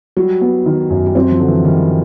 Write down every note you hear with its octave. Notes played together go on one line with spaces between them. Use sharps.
F#3 G3
B3
D#3
F#2
G3
F#3 C4
F3
D3
E3
D#3 G3